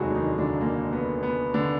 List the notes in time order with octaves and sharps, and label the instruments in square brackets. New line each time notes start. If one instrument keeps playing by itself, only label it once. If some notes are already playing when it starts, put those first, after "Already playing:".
Already playing: [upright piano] F1 D#2 D#3 F#3 G#3 F#4 G#4
D4
D#3 D#4
D3 D4
A#3
B3
B3
D3 D4